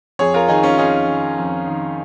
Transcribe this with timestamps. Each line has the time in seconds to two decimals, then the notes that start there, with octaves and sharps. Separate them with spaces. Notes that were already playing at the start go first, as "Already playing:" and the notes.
0.19 F2 G#4 C#5
0.34 F4 A#4
0.48 D#3 D#4 G#4
0.63 C#4 F4
0.78 F2 D#4 G#4
1.08 D#3
1.38 F2
1.67 D#3